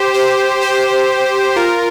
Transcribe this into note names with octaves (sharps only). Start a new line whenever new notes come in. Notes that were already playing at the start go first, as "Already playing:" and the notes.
Already playing: G4 C5
G4 C5
G4 C5
F4 A#4